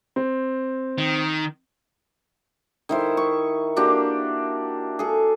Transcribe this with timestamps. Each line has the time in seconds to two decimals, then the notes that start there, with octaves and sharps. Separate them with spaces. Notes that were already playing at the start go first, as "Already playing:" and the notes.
0.16 C4
0.98 D#3
2.89 D#3 E4 C5
3.17 C#6
3.76 A#3 D4 F#4 G4
4.99 G#4 A4